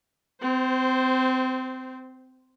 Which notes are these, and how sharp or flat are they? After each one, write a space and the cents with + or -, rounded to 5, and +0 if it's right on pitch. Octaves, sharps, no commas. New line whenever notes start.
C4 -25 C5 +0